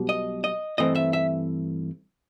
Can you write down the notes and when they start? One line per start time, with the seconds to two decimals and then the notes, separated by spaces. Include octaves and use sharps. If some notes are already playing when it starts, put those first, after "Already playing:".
Already playing: B1 B2 G3
0.09 D#5
0.44 D#5
0.78 G2 E3 A3 C4 D#5
0.95 E5
1.13 E5